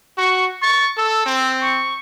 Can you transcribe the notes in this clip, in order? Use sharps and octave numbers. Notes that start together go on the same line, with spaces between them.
F#4 C#6
C#6 A6
A4 E6
C4
C#6